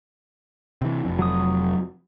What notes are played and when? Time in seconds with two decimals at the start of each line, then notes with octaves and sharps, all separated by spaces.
0.82 C3 E3
1.05 F1 F2
1.19 F#3 D#6